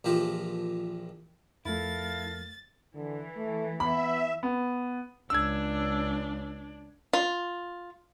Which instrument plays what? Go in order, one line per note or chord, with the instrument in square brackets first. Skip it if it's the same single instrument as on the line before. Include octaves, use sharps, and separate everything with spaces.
[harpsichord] A#1 E3 F3 G4 A#4
[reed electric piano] F2 F3 A3 [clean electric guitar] E4 [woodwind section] A4 A#4 F5 [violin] A6
[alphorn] D3 [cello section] E3
[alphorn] A3
[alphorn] B3 [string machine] E5 [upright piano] B5
[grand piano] B3
[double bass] C#2 [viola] D4 [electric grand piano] E6 G#6
[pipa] F4